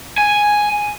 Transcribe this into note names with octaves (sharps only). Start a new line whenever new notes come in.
G#5